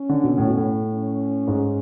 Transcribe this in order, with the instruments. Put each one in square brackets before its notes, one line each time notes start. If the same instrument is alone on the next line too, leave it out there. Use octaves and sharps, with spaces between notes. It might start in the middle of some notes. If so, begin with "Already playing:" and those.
Already playing: [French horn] C#4
[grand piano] D3
B2
A2
B2
A2
[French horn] C#4
[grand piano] G#2